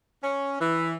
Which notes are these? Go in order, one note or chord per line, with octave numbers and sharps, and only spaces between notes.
C#4
E3